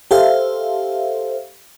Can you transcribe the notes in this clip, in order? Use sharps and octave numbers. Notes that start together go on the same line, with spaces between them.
G4 A4 C5 E5 F5